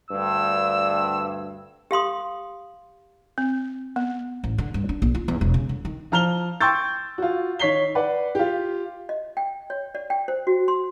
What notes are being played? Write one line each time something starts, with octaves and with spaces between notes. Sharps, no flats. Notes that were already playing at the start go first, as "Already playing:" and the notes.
D2 G2 E6
G4 F5 C6 D#6
C4
B3
A1
D3
G2
D4
A#1
F4
E2
E1
C#3
D3
D#3
F3 A#5 F6 F7 G7
G5 C6 C#6 E6 G6 A6
F4 F#4
D#3 C#5 B6 C7 G7
B4 D5 F#5
F4 G4
D#5
G5
C#5
D5
G5
C5
F#4
C6